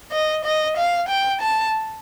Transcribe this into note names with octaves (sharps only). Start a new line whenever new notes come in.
D#5
D#5
F5
G5
A5